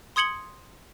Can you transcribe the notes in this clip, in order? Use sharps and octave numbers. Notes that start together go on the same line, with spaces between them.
C6 D#6 G#6 C#7 F#7 G7